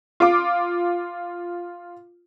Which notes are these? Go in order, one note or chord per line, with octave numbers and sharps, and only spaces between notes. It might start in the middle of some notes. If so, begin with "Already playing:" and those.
F4 D6